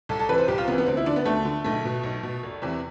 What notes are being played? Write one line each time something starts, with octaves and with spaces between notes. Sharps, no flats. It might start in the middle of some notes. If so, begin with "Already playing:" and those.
C2 A4
A4
C3 E3 B4
C5
C2 G4
F4
C3 E3 B3
B3
D2 C4
E4
D3 D4
B3
D2 A3
D3
B1 A3
B2
B1
B2
F1
E2 C3 E3